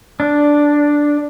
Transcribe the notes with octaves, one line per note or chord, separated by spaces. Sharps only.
D4